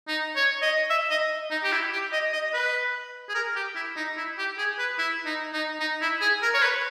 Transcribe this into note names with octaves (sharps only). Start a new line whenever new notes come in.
D#4
C#5
D#5
E5
D#5
D#4
G4
E4
G4
D#5
D#5
B4
G#4
A#4
G4
E4
D#4
E4
G4
G#4
B4
E4
D#4
D#4
D#4
E4
G#4
A#4
C#5
B4